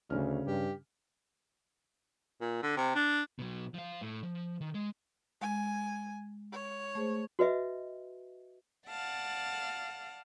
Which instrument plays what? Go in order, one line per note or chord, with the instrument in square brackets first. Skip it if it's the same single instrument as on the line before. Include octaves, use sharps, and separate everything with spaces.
[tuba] D2 [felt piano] C#3 C#4 F6
[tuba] G2 [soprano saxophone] G4
[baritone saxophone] A#2
D3
C3
D4
[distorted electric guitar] B2 F#3
F3 F5
A2
F3
D#3
G#3
[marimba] G#3 [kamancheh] G#5
[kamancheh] C#5
[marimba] A3 G#4 C5
[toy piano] F#4 B4 D#5 E5
[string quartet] D5 F5 F#5 A5